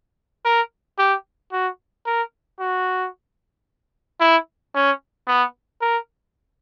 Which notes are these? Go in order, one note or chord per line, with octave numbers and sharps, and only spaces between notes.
A#4
G4
F#4
A#4
F#4
E4
C#4
B3
A#4